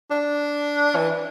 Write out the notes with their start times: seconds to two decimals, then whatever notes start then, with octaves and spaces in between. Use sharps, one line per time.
0.11 D4
0.96 E3